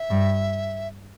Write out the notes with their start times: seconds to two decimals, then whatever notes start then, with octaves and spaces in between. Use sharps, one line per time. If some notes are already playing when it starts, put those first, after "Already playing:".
Already playing: E5
0.10 G2